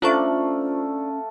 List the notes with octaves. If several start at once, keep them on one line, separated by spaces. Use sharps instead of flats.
A3 C#4 D4 F4 A4 C5 F5 C#6